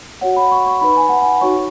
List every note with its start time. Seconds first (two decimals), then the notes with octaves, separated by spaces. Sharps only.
0.21 F#4 C#5 F#5
0.36 B5
0.52 C#6
0.66 C#6
0.81 D#4 B4 B5
0.97 G#5
1.09 F#5
1.22 G#5
1.41 D#4 F#4 C#5 C#6